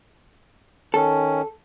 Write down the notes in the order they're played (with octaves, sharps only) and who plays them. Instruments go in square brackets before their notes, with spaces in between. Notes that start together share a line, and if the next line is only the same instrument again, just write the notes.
[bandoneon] D#3 C#4 [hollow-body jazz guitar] A4